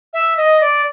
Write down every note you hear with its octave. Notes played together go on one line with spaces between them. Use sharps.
E5
D#5
D5